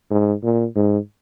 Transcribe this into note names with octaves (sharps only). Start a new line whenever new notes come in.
G#2
A#2
G#2